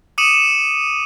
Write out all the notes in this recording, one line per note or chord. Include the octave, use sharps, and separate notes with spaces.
D6 D#6 C#7 D#7 E7 F#7